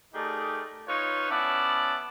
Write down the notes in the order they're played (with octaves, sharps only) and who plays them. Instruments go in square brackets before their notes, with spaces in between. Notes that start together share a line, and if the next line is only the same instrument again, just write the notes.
[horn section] A3 D#4 G4 G#4 A#4 D5
D#4 F4 B4 C#5
B3 C#4 E4 D5 F#5 A5